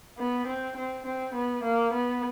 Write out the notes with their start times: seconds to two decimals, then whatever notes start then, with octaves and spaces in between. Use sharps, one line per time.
0.18 B3
0.47 C4
0.77 C4
1.06 C4
1.34 B3
1.64 A#3
1.93 B3